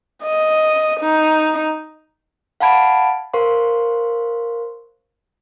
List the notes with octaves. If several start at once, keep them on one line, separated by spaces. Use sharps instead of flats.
D#5
D#4
F5 F#5 A5 B5 G#6 D7
A#4 C5 F5 C6 C#6